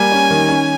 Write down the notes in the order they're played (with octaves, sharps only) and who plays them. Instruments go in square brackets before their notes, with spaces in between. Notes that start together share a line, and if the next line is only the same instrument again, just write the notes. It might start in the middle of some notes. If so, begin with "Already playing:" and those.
Already playing: [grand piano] G3 A#3 [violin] G#5
[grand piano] C#4
D#3
C#4